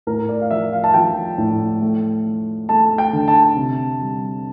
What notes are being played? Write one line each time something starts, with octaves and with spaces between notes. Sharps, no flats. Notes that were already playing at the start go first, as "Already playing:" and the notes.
A2 A#4
D5
F5
F3 E5
F5
A5
F3 G5
A2
A3
A3
A3 A5
G5
D3
A5
C3
G3